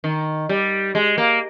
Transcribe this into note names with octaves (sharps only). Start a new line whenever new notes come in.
D#3
G3
G#3
A#3